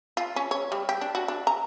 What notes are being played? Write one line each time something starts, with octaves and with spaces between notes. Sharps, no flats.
F4
C#4
C#5
G3
G4
D4
F#4
D4
A#5